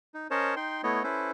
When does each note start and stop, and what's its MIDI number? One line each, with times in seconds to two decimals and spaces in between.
0.14 0.27 63
0.31 0.55 61
0.31 0.55 70
0.31 0.55 72
0.31 0.55 73
0.31 0.55 75
0.31 0.55 81
0.56 0.82 63
0.56 0.82 79
0.56 0.82 84
0.83 1.03 57
0.83 1.03 59
0.83 1.03 64
0.83 1.03 73
0.83 1.03 75
1.03 1.31 61
1.03 1.31 64
1.03 1.31 69
1.03 1.31 71
1.03 1.31 72